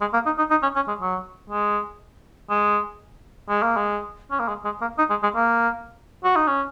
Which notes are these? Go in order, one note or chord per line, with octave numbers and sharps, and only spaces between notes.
G#3
A#3
D#4
D#4
D#4
C#4
C#4
G#3
F#3
G#3
G#3
G#3
A#3
G#3
C#4
A#3
G#3
G#3
A#3
D#4
G#3
G#3
A#3
F#4
D#4
C#4